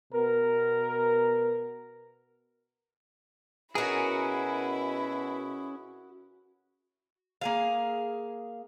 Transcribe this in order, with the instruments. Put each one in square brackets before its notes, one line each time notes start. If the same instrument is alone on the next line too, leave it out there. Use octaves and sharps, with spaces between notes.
[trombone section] B2 B3 A#4
[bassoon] B2 [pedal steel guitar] C#4 G#4 [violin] E4 [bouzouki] F#4 A#4
[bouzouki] A#3 G#4 F5